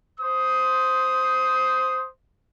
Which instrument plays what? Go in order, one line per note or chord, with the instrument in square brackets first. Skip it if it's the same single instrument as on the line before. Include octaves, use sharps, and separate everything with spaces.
[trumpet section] C5 D#6